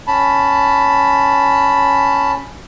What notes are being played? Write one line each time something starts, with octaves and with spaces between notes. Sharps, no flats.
C#4 A5 B5